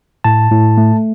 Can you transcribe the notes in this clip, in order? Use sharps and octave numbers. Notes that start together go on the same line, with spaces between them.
A2 A5
A2
A3